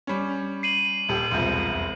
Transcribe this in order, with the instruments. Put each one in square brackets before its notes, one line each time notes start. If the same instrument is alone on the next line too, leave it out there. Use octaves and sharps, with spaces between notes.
[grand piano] G3 C#4
[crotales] C7 D#7 F#7
[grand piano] D#1 G4
E1 C2 F2